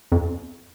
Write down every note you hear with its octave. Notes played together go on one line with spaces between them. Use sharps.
F2